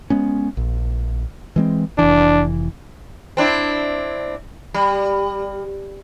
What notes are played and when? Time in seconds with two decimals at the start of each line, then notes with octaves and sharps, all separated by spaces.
0.10 G#3 B3 C#4
0.57 A#1
1.56 E3 G#3 C4
1.98 F1 E3 D4
3.37 C4 D4 E4
4.74 G3